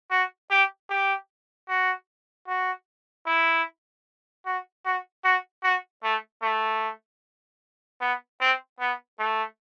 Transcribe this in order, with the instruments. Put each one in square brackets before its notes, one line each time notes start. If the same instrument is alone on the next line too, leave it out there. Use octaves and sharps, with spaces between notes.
[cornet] F#4
G4
G4
F#4
F#4
E4
F#4
F#4
F#4
F#4
A3
A3
B3
C4
B3
A3